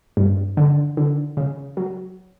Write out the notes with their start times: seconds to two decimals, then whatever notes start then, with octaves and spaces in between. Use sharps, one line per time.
0.17 G2
0.57 D3
0.97 D3
1.37 C#3
1.77 F#3